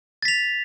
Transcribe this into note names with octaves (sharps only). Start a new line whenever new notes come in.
A6 B6 F7